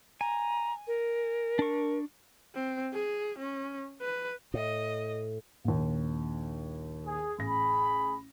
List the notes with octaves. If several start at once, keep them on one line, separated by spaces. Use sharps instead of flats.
G#5 A#5
A#4
D4 C#6
C4
G#4
C#4
B4
A2 D#5
A#1 D#2
G#4
A1 G#4 B5 A#6